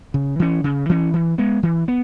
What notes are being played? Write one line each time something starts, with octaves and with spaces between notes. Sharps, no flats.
C#3
E3 C#4
C#3
E3 C#4
E3
G#3 B3
E3
B3